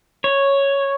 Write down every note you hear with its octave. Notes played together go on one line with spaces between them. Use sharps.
C#5